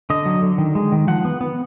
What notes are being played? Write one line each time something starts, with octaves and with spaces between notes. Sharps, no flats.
D3 D#5
F#3
D3
D#3
G#3
D#3
F3 F#5
B3
B3